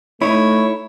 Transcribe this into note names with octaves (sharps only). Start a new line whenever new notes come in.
A3 D#4 E4 C#5